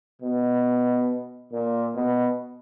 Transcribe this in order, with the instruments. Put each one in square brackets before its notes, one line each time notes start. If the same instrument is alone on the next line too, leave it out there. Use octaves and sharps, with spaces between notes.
[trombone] B2
A#2
B2